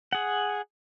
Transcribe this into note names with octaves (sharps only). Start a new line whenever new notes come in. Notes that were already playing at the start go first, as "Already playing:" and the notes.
G#4 F#5